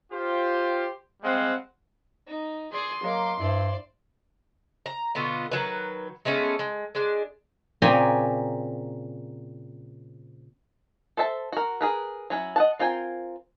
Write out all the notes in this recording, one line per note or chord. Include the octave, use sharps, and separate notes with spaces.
F4 G4 C5
G3 G#3 C4 C5 F5 F#5
D#4
G#4 D5 C6
F#3 G#3 A#3 D6
G2 E4 C5 D5
A#5
B2 D3 B3 F4
D#3 F#3 B4
G#3 A3 B3 C#4
G#3
G#3 D4
A#2 C#3 C4 G4 G#5 A#5
A4 C5 E5 A5
F#4 A#4
G#4 A#4 B4
F#3 C#4 E4
D#5 F#5 A5
C4 F4 A#4 G5 G#5